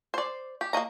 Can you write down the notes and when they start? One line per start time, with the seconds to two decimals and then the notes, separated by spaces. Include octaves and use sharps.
0.14 C5 D5
0.61 G4
0.73 A#3 G#4 D#5 A#5